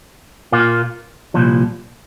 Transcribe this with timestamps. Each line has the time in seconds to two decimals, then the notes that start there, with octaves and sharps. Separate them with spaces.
0.52 A#2 A#3 F4
1.34 C2 A#2 F3